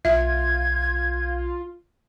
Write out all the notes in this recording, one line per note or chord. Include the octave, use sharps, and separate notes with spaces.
B1 F4 E5 G#6